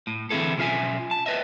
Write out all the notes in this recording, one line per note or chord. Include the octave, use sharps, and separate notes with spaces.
A2
D3 E3 C4 E4 G#4 A4
B1 C#4 F4 E5 G#5
A5
B4 D#5 E5